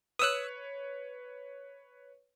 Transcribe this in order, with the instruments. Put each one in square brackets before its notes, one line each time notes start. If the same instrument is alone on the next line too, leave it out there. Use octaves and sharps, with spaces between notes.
[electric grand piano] B4 C#5 [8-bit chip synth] D#6 E6 F#6